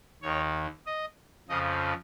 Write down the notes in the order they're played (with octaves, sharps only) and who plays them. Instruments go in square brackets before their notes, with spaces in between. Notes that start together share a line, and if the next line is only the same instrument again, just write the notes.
[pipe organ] D#2 D#3 C#5
D#5
F2 C#3 F3 D#5